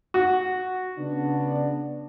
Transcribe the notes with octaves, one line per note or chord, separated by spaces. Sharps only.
F#4
C#3 B3 D4